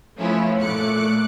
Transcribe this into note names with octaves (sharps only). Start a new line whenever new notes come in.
F3 A3 B3 C#4 E4 F4
A#2 A3 D6 F#6 C#7